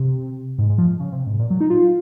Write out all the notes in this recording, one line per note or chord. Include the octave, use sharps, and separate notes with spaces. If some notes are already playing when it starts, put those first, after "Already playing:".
Already playing: C3
G#2
G#2
F3
C#3
C3
G#2
A#2
F#3
D#4
F4